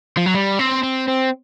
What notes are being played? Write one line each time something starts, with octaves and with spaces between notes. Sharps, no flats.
F3
F#3
G3
C4
C4
C4